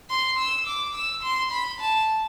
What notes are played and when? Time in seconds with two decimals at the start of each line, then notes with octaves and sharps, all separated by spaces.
0.10 C6
0.38 E6
0.67 D6
0.95 E6
1.23 C6
1.51 B5
1.80 A5